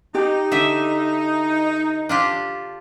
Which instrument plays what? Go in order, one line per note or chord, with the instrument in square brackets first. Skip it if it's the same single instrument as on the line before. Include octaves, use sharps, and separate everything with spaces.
[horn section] D#4 [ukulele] G4
[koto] D3 E5
D4 F4 G4